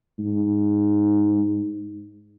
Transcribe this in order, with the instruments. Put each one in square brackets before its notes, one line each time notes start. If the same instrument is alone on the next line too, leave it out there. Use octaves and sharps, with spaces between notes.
[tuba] G#2